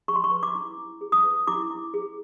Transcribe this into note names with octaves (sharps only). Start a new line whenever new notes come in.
G#4 C#6
C6
C#6
B4
D6
E4
E4
G#4
D#6
B4
E4 D6
E4
G#4